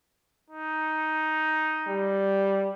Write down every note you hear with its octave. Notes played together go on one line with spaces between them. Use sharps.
D#4
G3